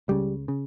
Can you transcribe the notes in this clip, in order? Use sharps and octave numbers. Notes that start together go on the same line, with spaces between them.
C#2 C#3 G3
C#3